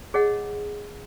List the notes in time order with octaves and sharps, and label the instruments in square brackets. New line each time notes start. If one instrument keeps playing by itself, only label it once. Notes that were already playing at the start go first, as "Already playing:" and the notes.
[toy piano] G#4 C#5 D#5 F#5